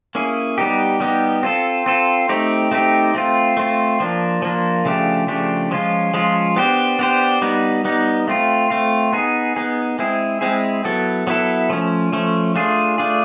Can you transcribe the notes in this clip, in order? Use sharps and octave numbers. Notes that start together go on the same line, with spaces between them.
A#3 C#4 E4 G#4
G3 B3 D#4 G4
G3 B3 D#4 G4
C4 F4 A4
C4 F4 A4
A3 C4 D#4 G4
A3 C4 D#4 G4
A3 C4 F4
A3 C4 F4
F3 A#3 D4
F3 A#3 D4
C#3 F3 A3 D4 G4
C#3 F3 A3 D4 G4
F3 G#3 C#4 F4
F3 G#3 C#4 F4
B3 D4 G4 C5
B3 D4 G4 C5
G3 B3 D#4
G3 B3 D#4
A3 C4 F4
A3 C4 F4
B3 D#4 G#4
B3 D#4 G#4
G#3 C4 E4 G#4
G#3 C4 E4 G#4
F#3 B3 E4 A4
F#3 B3 E4 A4
F3 A3 C#4
F3 A3 C#4
A3 D4 F4 G#4
A3 D4 F4 G#4